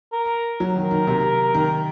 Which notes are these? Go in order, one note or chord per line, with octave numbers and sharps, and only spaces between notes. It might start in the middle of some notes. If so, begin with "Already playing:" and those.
A#4
F#3
D#3
A#4
D#3
C3
D#3